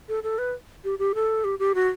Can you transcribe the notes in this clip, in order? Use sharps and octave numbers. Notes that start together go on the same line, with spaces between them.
A4
A4
B4
G4
G4
A4
G4
G4
F#4